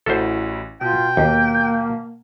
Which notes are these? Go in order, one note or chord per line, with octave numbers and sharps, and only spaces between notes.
A1 E4 F#4 A4 C5
B2 F4 G5
D#2 A#3